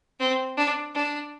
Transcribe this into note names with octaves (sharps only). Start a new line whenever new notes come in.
C4
D4
D4